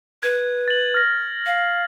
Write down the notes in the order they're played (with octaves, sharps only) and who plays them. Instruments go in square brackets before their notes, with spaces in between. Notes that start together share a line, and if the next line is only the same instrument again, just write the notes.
[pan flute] B4 [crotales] G#6
[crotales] A6 F#7
F6 A#6
[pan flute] F5